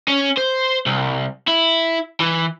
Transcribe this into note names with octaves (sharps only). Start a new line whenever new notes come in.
C#4
C5
C2
E4
E3